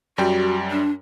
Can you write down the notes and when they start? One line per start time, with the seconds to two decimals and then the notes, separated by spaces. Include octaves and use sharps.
0.18 F#2 G3 F#4 G5
0.71 D4